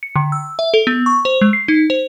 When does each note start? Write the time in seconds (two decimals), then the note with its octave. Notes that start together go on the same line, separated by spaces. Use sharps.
0.03 C#7
0.16 D3
0.32 E6
0.59 E5
0.74 A4
0.87 B3
1.06 C#6
1.25 C5
1.41 G#3
1.53 C7
1.68 D#4
1.90 C5